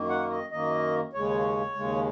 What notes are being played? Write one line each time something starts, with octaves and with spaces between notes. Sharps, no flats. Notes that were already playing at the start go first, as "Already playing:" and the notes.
Already playing: F#2 D#3 A#3
F#5
D#5
F#2 D#3 A#3 D#5
D#2 C#3 G#3 C#5
D#2 C#3 G#3